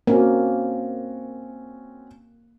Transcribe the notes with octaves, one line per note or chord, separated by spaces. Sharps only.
A#3 C4 C#4 F#4